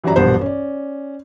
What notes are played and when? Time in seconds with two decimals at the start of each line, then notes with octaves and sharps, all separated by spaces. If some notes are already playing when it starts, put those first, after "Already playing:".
0.04 F#2 E3 F#3 G3 D5 A#5
0.16 E1 A#1 G2 G3 B3 C5
0.41 C#4 D5